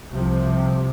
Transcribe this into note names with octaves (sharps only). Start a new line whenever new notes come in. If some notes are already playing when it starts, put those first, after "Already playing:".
C2 C3 F3